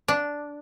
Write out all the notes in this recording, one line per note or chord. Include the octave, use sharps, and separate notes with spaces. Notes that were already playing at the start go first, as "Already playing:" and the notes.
D4